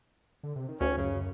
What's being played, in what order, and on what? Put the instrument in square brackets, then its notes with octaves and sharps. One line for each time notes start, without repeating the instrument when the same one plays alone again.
[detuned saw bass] D3
C3
D#3
[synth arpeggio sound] D2 [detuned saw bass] D#3 [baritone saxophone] C#4
[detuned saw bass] F#2 [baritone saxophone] C#3